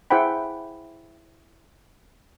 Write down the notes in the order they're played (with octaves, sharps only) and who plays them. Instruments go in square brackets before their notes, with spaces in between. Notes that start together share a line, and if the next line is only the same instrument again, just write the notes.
[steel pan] E4 G#4 C5 F#5 G5 B5